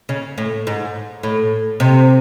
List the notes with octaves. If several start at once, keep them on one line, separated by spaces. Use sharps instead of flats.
C#3
A2
G#2
A2
C3